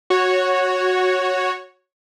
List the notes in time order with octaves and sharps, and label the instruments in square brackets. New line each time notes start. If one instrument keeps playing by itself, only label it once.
[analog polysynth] F#4 C#5